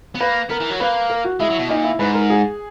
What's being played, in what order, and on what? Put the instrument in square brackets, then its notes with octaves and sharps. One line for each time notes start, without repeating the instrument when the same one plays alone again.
[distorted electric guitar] B3
[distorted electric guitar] A#3 [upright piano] B4
[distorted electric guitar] B3 [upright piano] A#4
[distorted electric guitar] E3
F#3
[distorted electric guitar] A#3 [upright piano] B4
[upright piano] A#4
F#4
[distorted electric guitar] G#3 [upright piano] E4
[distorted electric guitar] F#3
B2
[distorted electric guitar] A#2 [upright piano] D#4
[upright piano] E4
[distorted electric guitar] G#2 [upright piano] B4
[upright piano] A#4
G#4